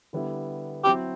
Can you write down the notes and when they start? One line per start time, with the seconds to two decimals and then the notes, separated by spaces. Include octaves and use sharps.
0.13 D3 G3 B3 E4
0.84 F#3 C4 E4 G4